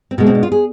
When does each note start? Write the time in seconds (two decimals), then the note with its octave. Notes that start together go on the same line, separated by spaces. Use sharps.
0.11 C4
0.18 B2 G#3 B3
0.26 C4
0.35 D4
0.43 F4
0.52 G#4